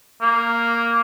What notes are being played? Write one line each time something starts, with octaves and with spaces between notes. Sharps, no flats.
A#3